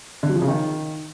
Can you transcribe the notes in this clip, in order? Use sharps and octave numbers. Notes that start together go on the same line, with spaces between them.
D3
F#3
F3
C#3
D#3